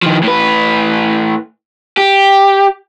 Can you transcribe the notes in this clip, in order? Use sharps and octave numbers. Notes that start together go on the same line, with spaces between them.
D#3 F3
A2 B4
G4